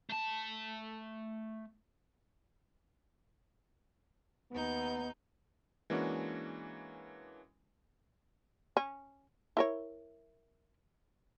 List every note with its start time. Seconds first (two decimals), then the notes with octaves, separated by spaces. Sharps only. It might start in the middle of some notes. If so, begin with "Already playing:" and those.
0.09 A3 A5
4.52 D#2 B3 D#4 G6
5.90 E3 G#3 A#3 C#4 D4 F#4
8.77 C#4
9.57 E4 A#4 C#5